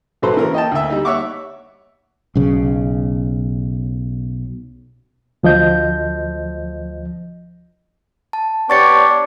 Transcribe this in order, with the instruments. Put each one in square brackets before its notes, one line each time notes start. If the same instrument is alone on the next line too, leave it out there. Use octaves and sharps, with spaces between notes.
[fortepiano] A#1 D#3 F#3 A4 B4 C5
C#3 E3 C#4 A#4
D#5 G5 A5
D2 E5
G3 D#4
C#5 E5 F#5 C#6 D6
[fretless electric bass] B1 C#3
[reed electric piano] D2 F3 D#5 G6
[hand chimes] A5
[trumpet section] B3 G4 C#5 [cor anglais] D4 [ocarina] D5 [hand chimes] C#6 A6 C#7